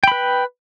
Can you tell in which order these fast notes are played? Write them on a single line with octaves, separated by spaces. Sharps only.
G5 B5 B4